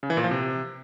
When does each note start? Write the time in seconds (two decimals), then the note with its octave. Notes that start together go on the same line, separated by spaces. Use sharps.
0.03 C#3
0.10 E3
0.17 A#2
0.24 F3
0.31 C3